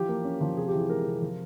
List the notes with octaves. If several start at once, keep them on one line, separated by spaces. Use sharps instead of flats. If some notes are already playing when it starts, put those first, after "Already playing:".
Already playing: E3 F3 G4
A#3
C#4
F3
C3 G#4
G4
E3
G#4
G#3 A#4
C3
F3